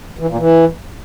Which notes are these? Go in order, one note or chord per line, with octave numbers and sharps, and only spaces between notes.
E3
A#2
E3